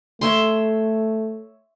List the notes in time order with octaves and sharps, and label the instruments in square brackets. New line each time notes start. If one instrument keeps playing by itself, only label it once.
[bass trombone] A3 [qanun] C#5 E5 C6